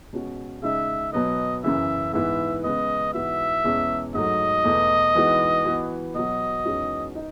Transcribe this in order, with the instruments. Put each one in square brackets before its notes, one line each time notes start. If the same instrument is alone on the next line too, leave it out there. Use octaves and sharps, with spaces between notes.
[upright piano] B2 G#3 C#4 F#4
[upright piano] C#3 G#3 D#4 [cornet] E5
[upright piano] B2 F#3 B3 [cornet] D#5
[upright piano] F#2 C#3 E3 [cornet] E5
[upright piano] G#2 E3 B3 [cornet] E5
[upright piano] C#3 G#3 B3 [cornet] D#5
[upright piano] G#2 E3 B3 F#4 [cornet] E5
[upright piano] E2 B2 G#3 C#4
[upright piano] G#2 F#3 A3 [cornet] D#5
[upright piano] E2 B2 A3 E4
E3 G#3 B3 D#4 F#4
E3 B3 F#4
[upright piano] B2 F#3 B3 F#4 [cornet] D#5
[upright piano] E2 D#3 G#3 C#4 F#4
D#4